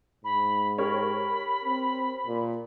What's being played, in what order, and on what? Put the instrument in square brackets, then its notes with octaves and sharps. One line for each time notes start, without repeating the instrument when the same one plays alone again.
[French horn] G#2 [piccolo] B5
[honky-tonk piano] G4 A#4 C#5 [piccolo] B5
[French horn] C4
A#2